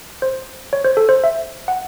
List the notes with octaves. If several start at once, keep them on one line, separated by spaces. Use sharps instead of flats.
C5
C#5
C5
A4
C5
E5
F#5